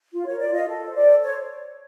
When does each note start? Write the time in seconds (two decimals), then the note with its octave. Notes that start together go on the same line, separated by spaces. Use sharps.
0.12 F4
0.26 A#4 C#5
0.40 D5
0.48 F4
0.54 D#5
0.67 A4
0.85 C5
0.95 D5
1.05 A4
1.23 C5 C#5